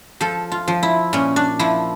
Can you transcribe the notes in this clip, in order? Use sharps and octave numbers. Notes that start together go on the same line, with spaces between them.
F3 A4
F4
F3
E4
A#2 C#4
D4
F3 E4